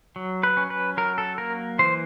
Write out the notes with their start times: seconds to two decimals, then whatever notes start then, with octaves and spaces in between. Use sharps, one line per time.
0.16 F#3
0.43 B4
0.57 C#4
0.70 B4
0.97 F#3 A#4
1.18 A4
1.38 A#3 A#4
1.79 E3 C5